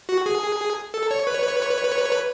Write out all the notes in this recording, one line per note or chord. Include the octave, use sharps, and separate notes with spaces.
F#4
G#4
A4
C#5
B4
C#5
B4
C#5
B4
C#5
B4
C#5
B4
C#5
B4
C#5
B4